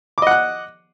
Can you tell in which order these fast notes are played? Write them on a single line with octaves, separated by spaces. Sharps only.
D6 D#5 F#5 F#6